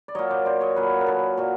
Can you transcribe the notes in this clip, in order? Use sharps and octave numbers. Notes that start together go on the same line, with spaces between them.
D5
A#2 F#3 C#5 D#5
C5 D5
C5 D5
C#5 D#5
A#2 F#3 B4 C#5
A#4
A4 B4
A#2 F#3